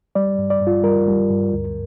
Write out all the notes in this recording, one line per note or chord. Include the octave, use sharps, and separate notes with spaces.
G3 D5
G2
D5
G2
F4
G3 A#4
G3
G2
D2